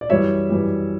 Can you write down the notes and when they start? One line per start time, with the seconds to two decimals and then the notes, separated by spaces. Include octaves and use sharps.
0.01 D5
0.10 F#2 E3 G3 C#5 E5
0.50 F#2 E3 G3